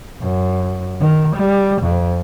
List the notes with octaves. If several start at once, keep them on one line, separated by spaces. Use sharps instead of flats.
F#2
D#3
G3
F2